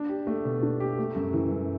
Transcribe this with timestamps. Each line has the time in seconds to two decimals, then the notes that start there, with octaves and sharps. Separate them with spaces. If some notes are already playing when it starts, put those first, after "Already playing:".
Already playing: D4
0.09 G4
0.27 A3
0.45 B2
0.63 D4
0.80 G4
0.99 A3
1.16 F#2
1.34 E3
1.51 F#2